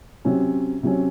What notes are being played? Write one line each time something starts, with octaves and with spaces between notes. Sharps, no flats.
C3 F#3 C#4
C3 F#3 C#4